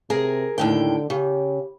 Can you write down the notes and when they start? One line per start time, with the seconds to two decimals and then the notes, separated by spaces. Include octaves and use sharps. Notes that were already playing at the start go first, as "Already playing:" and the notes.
0.10 C3 G#4 A#4
0.58 D#2 A2 D3 G5
1.10 C#3 G4